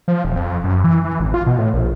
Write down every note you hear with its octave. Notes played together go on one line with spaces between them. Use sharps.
F3
E1
F2
F#2
E3
E3
G#1
F4
B2
A2
A#1